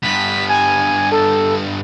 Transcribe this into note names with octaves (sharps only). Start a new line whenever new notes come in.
G2 B3 B6
G#5
A4